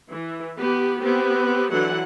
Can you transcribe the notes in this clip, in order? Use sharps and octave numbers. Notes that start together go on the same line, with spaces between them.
E3
B3 G4
B3 C4 G4
D3 E3 F#3 F#5